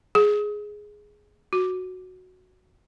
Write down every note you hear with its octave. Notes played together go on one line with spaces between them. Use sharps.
G#4
F#4